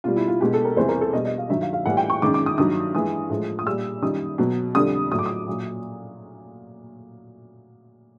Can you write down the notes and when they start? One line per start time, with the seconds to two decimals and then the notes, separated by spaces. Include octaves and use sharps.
0.04 B2 G3 F4
0.16 E4
0.28 F4
0.41 B2 G#3 G4
0.53 A4
0.65 A#4
0.76 E2 C3 E3 G3 C5
0.89 A#4
1.01 A4
1.13 B2 G3 D#5
1.25 D#5
1.38 F5
1.49 G2 D#3 F#3 E5
1.62 F5
1.73 F5
1.85 A2 E3 G3 F#5
1.97 G5
2.10 C#6
2.22 F#2 D#3 G#3 D6
2.34 D6
2.46 D#6
2.57 G2 D#3 F#3 D#6
2.94 G2 E3 G#3 D#6
3.30 A2 F3 G#3
3.59 D#6
3.66 A#2 G3 E6
4.02 F#2 D#3 G3 D#6
4.38 B2 F#3
4.75 F2 D3 G3 D#6
5.12 A2 F#3 D#6
5.19 D6
5.26 D#6
5.48 A#2 F#3